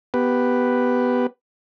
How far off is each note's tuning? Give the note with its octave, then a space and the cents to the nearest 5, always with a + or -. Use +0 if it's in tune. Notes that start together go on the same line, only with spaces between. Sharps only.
B3 +0 G4 +0 B4 +0